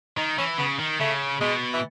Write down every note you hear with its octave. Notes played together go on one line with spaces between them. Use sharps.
D#3 D#4
E3 C#4
C#3 B3
D#3
C#3 A3
B2 G#3
E3